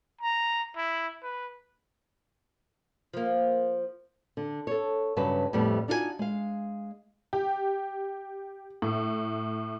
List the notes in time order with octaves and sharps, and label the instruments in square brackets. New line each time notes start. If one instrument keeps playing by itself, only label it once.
[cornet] A#5
E4
B4
[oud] F3 A#3
[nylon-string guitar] D3
A4 C#5
G2 C#3 F#3 B4 A5
F2 A2 G3 A3 B3
D4 D#4 F4 F#4 B4 G#5
G#3 F5
[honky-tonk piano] G4
A2